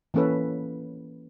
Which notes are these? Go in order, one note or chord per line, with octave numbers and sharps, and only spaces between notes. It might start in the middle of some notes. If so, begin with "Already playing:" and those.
E3 A#3 C#4 A4 B4